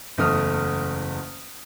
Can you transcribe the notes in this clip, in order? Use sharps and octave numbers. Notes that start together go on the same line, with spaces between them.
F#1 E2 A3 D#6 F6